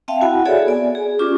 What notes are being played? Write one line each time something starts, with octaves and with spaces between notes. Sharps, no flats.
C4 E5 F5 G5 A5
E4 F#4 F#5 G#5 B5
F#4 G#4 A4 C#5 D5 E5
B3 D5 G#5
G#4
C#4 F4 G4 C#6 D6